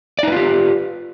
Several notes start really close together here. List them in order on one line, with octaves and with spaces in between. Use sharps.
D5 D#4 B4 F4 G4